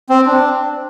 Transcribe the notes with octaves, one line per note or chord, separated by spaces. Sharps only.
C4
D4